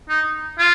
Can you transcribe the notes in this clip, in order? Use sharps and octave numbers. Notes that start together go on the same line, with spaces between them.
D#4
F4